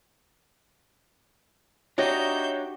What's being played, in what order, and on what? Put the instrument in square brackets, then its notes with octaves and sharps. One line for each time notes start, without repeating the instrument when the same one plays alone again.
[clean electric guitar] D4 D#4 [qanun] F#4 G4 D#5 [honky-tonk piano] C#5 [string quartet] E5 G6